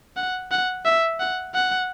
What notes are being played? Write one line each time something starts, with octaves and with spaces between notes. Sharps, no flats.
F#5
F#5
E5
F#5
F#5